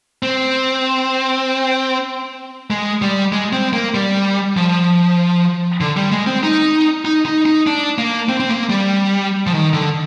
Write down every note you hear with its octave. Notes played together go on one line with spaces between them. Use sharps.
C4
G#3
G3
G#3
C4
A#3
G3
F3
D3
G3
G#3
C4
D#4
D#4
D#4
D#4
D4
A#3
C4
C4
A#3
G3
F3
D#3
D3